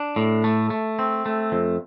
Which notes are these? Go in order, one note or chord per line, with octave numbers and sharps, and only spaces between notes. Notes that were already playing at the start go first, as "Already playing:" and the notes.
Already playing: D4
A2
A3
A3
C4
A3
F2